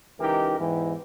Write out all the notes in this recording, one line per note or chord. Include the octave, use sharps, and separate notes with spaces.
C#2 E3 D#4 G4 A#4
E2 G#2 E3